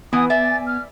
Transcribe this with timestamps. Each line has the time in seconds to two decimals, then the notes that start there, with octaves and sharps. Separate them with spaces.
0.13 E3 B3 G#5 D#6
0.30 D5 E5 A6
0.67 F6